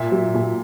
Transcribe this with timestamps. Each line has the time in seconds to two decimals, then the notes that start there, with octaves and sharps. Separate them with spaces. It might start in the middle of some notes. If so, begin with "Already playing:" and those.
Already playing: A#2 E5
0.12 F#3
0.34 A#2